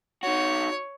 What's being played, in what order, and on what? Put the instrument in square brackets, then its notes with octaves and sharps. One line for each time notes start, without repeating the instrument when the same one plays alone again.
[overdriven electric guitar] D#4 F#4 [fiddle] C#5